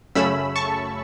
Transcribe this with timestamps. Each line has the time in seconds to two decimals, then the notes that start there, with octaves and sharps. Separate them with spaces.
0.15 F#2 C#3 A3 C#4 B5 E6
0.56 A5 C#6